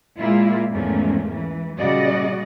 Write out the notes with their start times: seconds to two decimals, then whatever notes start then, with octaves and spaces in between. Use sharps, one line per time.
0.18 A#2 G#3 A#3 E4 F4
0.72 E2 G#2 F3 A3 A#3 C#4
1.33 E3
1.77 A#2 C#3 G3 F#4 D5 D#5